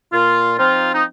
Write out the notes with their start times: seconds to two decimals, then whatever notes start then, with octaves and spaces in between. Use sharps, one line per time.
0.13 A#2 F4
0.58 F3 C4 D#4 F4
0.94 D#4